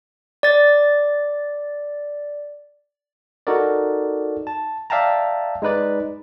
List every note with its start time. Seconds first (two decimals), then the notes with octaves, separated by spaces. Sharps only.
0.43 D5 A6
3.47 D#4 F#4 A4 A#4 D5
4.47 A5
4.90 D5 E5 F5 G5 A5 A#5
5.62 G#3 D#4 B4 D5